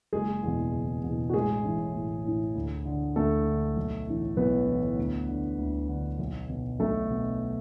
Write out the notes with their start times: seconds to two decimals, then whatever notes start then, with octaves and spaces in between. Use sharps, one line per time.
0.13 F#1 G#3 G#4
0.43 E2 B2
0.73 F#1
1.04 E2 B2
1.30 F#4
1.34 A1 G#3 G#4
1.64 A2 E3
1.94 A1
2.25 A2 E3
2.55 D2
2.86 D3
3.16 D2 A3 A4
3.46 D3
3.77 B1
4.07 A2 E3
4.37 B1 B3 B4
4.67 A2 E3
4.97 D2
5.28 D3
5.59 D2
5.89 D3
6.19 B1
6.49 B2
6.79 B1 A3 A4
7.10 B2